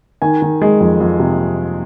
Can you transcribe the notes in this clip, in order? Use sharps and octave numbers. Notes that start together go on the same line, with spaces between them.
D#3 G#5
D#3
G#3
F2
F2
C3